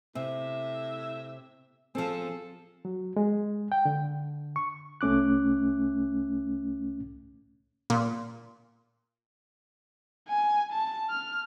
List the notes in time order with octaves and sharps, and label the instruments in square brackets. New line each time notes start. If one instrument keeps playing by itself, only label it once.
[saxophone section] A2 E5 [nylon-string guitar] C3
[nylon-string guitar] F3 C4 [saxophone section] G#4 A4
[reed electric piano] F#3
G#3
G5
D3
C#6
C2 A3 C#4 D6 F#6
[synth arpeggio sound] A#2
[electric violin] G#5
A5
F6